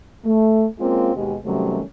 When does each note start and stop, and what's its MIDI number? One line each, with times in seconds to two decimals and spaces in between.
0.25 0.65 57
0.79 1.14 56
0.79 1.14 58
0.79 1.14 60
0.79 1.14 61
0.79 1.14 65
1.14 1.35 39
1.14 1.35 47
1.14 1.35 56
1.14 1.35 67
1.14 1.35 68
1.44 1.81 48
1.44 1.81 51
1.44 1.81 54
1.44 1.81 55
1.44 1.81 57
1.44 1.81 61